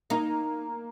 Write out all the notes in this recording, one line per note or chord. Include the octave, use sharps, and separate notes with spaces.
A#3 D#4